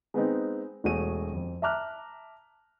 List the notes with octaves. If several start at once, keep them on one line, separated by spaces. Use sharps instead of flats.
G#3 B3 C4 D#4
E1 A3 F#4 G#4 D#7
F2
E5 A5 A#5 D6 F6 F#6